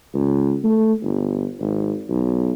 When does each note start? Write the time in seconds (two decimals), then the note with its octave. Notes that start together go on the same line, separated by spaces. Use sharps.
0.14 C#2
0.63 A3
1.03 G1
1.60 G#1
2.09 B1